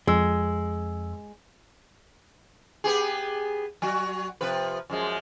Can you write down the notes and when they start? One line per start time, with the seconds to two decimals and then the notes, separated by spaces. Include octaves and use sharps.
0.07 F2 G#3 E6
2.84 B3 G4 G#4
3.82 F#3 F#4
4.41 C3 F3 B4
4.90 F#2 F3 G#3